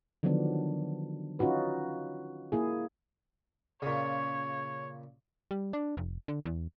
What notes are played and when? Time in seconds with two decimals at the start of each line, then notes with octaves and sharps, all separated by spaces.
0.23 D3 D#3 F3 F#3 B3 D4
1.39 C#4 D#4 F4 F#4 B4
2.52 A#3 E4 G#4
3.82 A#2 C#3 C#5
5.51 G3
5.73 D4
5.97 F1
6.28 D3
6.46 E2